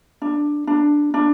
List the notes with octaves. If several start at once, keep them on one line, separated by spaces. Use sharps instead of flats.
D4
D4
D4